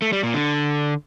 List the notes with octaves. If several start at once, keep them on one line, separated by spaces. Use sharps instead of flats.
A3
G3
A#2
D3